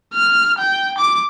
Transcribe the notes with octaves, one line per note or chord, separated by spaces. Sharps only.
F6
G5
D6